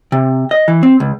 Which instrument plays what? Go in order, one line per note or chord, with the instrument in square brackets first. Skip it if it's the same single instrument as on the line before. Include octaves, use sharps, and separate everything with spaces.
[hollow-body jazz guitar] C3
D#5
E3
C4
C#2